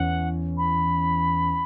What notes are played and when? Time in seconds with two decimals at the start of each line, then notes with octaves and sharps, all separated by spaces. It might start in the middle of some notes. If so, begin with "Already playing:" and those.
Already playing: E2 E3 C#4 F#5
0.57 B5